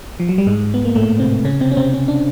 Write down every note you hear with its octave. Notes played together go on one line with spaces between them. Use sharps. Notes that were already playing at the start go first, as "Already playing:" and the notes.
F3
F#3
G3
G#2 G#3
B3
A#3
A2 A3
C3 C4
C#3 C#4
C3 C4
C#4
C3 C4
C#4
D4